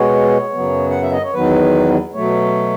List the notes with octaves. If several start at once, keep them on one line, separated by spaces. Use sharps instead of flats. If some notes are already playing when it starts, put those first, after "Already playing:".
Already playing: B2 G#3 B3 C#5
F#2 C#3 F#3 B3
F#5
E5
D#5
C#5
E2 D#3 F#3 B3 B4
B2 F#3 A3 C#5